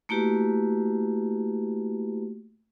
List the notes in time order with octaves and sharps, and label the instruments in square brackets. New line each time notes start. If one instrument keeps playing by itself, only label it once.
[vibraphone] A3 A#3 E4 F#4 G4 B4